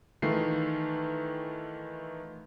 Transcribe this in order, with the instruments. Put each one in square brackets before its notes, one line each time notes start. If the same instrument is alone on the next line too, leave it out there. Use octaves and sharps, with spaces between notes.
[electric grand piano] D#3 E3 A3 F4 C7